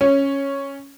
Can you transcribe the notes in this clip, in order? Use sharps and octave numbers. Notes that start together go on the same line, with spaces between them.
C#4